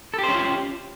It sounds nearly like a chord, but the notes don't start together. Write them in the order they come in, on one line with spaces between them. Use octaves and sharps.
A4 G4 C5 C#4 F4